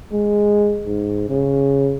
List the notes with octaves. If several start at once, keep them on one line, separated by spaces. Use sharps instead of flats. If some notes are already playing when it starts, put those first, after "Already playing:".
G#3
G#2
C#3